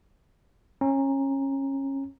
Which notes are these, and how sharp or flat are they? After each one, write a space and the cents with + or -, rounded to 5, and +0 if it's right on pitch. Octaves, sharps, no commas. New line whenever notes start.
C#4 -25 A#5 +0